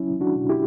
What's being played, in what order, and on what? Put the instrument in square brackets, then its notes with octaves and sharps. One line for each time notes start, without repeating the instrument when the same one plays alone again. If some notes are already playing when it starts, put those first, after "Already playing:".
Already playing: [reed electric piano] F#3 C#4 E4
F#3
D4 F#4
B2
E4 G4